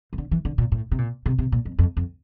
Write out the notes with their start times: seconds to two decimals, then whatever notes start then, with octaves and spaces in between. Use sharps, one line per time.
0.13 E3
0.18 D3
0.31 E3
0.45 D3
0.58 A#2
0.72 A2
0.91 C3
0.98 A#2
1.26 C3
1.39 C3
1.52 A#2
1.65 F2
1.79 F2
1.97 F2